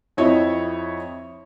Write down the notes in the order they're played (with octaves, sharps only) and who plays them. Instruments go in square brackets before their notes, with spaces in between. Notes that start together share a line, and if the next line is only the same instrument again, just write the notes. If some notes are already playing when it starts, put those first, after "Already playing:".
[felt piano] F2 E4 C#5 D#5 E5